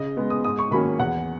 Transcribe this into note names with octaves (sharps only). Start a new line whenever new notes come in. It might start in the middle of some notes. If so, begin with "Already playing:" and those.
Already playing: C#3 D#5
G#3 B3
D#6
G#2 D#6
C#6
D#3 F#3 A#3 C#4 B5
E2 F#5